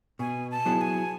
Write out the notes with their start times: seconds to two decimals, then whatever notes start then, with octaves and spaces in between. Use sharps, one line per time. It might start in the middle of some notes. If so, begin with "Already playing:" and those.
0.19 B2 G#5
0.51 A5
0.66 F#3 B3 E4 G#4
0.81 G#5